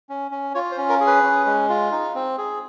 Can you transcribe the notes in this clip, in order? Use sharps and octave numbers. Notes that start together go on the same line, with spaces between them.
C#4
C#4
F4 C#5
C5
C#4
A#4
G#4
B4
C#4
G#3
F4
D#4
C4
G#4